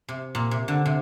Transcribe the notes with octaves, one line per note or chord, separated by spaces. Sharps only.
C3
A#2
C3
D3
C3